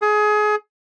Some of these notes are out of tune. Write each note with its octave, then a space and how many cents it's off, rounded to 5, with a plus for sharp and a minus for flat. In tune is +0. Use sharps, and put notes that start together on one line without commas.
G#4 +25